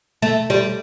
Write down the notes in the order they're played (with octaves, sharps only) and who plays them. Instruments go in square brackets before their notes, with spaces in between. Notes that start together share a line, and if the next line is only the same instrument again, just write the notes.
[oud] A3
G3